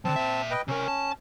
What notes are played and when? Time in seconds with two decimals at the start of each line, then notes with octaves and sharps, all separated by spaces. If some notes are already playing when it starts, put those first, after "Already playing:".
0.05 D3 F3 C4 A5
0.16 A#2 E5
0.51 B4 D#5 G5
0.68 C3 C#4 A#4
0.88 A5